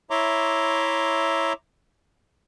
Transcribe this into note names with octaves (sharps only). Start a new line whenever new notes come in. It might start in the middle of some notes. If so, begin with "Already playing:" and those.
E4 C#5 E5 A#5 C6 D6